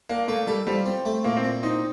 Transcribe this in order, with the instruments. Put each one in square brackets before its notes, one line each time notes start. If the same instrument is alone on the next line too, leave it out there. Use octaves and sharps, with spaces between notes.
[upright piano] A#3 [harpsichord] D4
[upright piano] A3 [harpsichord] A#3
[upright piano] G3 [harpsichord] A4
[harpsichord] F3 [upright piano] G3
[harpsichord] C4
A3
[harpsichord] A#2 [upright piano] A#3
[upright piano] C4
[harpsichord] A#2
[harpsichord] C4 [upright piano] D#4